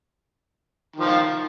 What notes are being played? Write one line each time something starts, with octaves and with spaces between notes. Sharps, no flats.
D#3 F3 F4